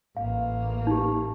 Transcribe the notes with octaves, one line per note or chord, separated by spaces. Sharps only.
A1 A#3 F5
D#4 G4